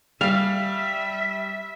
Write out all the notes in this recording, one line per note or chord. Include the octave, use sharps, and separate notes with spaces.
G3 E5 F5